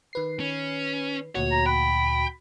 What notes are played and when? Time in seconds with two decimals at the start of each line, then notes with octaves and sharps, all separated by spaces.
0.13 D#3 B4 C7
0.40 C#4
1.35 D2 A#2 F#4 C#5
1.51 A#5
1.66 G5 B5